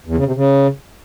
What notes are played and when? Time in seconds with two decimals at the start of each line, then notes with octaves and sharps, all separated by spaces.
0.07 E2
0.16 C#3
0.26 C3
0.35 C#3